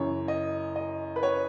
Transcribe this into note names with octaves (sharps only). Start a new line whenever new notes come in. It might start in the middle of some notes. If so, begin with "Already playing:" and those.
Already playing: F#2 C#3 E3 C#5
D#5
D#5
B4
C#5